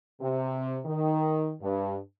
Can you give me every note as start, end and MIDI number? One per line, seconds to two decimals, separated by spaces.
0.21 0.80 48
0.86 1.52 51
1.62 1.97 43